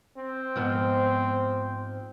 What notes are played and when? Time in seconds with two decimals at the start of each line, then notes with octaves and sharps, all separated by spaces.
0.17 C4
0.56 G#2 F3 B3